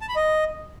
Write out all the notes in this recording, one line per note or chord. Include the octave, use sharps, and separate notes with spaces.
A5
B5
D#5